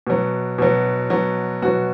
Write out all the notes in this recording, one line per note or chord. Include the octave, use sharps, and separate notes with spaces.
B2 F#3
B2 F#3
B2 F#3
B2 F#3 F#4